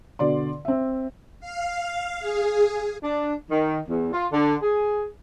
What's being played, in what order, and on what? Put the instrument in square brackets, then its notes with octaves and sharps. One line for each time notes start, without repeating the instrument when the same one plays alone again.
[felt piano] B2 D3 D5 C6
C4 E5
[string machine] F5
G#4
[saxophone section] D4
D#3
E2
F4
D3
G#4